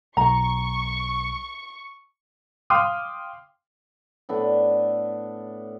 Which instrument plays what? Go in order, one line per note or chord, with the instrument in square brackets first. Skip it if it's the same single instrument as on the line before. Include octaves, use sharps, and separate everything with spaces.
[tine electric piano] B1 [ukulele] A#5 [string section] C#6
[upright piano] F5 G5 C6 D6 D#6 F6
[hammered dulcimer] A2 B3 D4